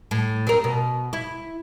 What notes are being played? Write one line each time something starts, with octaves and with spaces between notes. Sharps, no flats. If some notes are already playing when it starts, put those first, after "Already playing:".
A2
C4 A#4
B2
E4